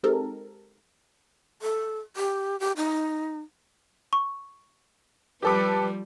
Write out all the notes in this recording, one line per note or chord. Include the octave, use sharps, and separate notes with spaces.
G#3 C4 D#4 G4 A4 A#4
A4
G4
G4
D#4
C#6
F3 G3 G4 A4 B4 D6